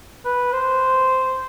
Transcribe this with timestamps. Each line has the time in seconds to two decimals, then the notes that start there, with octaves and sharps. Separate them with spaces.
0.25 B4
0.52 C5